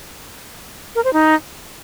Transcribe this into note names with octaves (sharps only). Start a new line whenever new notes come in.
A#4
C5
D#4